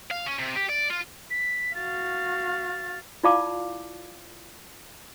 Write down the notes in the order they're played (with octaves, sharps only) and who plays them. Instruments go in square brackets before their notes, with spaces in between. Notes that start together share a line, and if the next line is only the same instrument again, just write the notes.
[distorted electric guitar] F5
C#4
C3
G4
D5
F4
[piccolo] B6
[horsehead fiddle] F#4 F5 [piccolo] A6
[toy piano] E4 F4 D5 F5 A5 D6